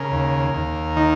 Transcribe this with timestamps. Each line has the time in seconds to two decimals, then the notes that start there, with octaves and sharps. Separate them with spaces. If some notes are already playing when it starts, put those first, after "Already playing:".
Already playing: C#3 A#4
0.12 D#2
0.54 D#2
0.96 D#3 D#4